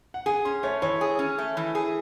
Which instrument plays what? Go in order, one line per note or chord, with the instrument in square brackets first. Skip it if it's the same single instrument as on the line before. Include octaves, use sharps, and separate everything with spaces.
[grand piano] F#5
[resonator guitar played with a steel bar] G#4 [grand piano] G#5
[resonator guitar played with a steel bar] C#4 [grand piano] C6
[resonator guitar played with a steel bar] A3 [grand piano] C#5
[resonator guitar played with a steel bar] E3 [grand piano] C#5
[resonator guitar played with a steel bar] G#4
C#4
A3
E3
G#4